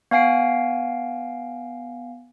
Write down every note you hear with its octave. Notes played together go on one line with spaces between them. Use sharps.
B3 F5 G#5 C7 D7